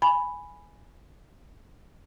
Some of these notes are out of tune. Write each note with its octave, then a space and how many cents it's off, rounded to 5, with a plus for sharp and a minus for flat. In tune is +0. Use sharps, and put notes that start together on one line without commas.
G#5 +0 B5 +0